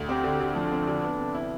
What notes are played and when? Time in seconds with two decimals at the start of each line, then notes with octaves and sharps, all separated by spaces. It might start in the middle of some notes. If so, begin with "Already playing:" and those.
Already playing: D2
0.09 C4 G4
0.24 D3
0.40 D3
0.55 F3 D4
0.72 C4
0.87 D3
1.03 B3
1.18 C3
1.34 E4